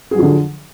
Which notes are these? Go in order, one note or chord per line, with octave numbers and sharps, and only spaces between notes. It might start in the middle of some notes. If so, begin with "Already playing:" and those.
D3 F3 F#3 G#4